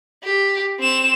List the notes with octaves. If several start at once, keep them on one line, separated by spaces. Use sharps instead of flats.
G4
C4 E7